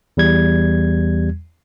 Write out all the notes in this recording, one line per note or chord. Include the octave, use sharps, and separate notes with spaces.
E2 G3 G#6